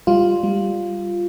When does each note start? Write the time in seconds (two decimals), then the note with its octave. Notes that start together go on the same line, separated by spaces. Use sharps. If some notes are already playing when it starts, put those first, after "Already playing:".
0.07 G3 F4
0.43 G3